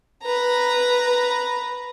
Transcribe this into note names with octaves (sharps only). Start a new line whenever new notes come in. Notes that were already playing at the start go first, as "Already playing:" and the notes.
B4 A#5